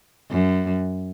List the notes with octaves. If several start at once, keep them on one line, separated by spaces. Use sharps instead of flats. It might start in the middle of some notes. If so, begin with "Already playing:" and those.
F#2